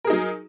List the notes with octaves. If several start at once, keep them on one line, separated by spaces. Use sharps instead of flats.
F#3 D#4 G#4 A#4